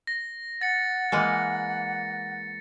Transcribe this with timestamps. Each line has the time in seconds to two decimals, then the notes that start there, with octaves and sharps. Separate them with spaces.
0.07 A#6
0.61 F#5 A6 C#7
1.12 E3 G#3 A#3